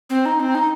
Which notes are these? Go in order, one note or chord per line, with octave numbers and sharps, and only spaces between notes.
C4
D#4
C4
D#4